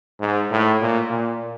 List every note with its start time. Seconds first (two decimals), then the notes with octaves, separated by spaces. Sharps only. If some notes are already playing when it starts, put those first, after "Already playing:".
0.20 G#2
0.51 A2
0.81 A#2
1.10 A#2